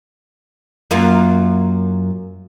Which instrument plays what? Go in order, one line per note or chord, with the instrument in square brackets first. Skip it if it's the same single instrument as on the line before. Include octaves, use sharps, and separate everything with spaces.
[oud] F#2 A#3 F4